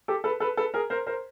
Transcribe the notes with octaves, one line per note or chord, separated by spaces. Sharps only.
G4 A4
A4 B4
A4 B4
A4 B4
G#4 A#4
A#4 C5
A#4 C5